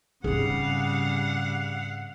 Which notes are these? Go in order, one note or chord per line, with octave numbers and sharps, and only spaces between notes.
G#2 C#3 G3 C4 G#4 F5 F#5